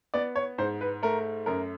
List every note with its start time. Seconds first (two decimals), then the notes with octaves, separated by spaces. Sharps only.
0.14 B3 D5
0.36 C#5
0.58 G#2 C5
0.81 B4
1.03 A3 A#4
1.46 F#2 A#4